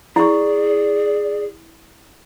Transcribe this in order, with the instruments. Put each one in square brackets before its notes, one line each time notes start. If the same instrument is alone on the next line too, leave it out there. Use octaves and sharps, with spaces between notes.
[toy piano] E4 C#6 [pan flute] G#4 [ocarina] D5